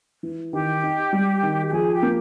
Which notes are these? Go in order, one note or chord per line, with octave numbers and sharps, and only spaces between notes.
E3
D#3 G4
D#4
G3
D#3
G4
F3 G#4
G4
A#3